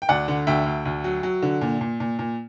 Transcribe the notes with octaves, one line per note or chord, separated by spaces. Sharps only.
G5
D2 D5 F#5
D3
D2 E5 G5
D2
D2
F#3
F#3
D3
A#2
A#2
A#2
A#2